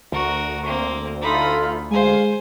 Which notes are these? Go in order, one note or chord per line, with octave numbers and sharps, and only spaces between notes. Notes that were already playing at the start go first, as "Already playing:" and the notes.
D2 F#4 A#4
A#3 C4
D#4 F4 A4 E5 B5
G#3 C5 F5 G#5